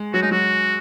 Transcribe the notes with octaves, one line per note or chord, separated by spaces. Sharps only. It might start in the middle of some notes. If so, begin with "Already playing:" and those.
Already playing: G#3
F#3 F#4
G#3 D#4
F#3 F#4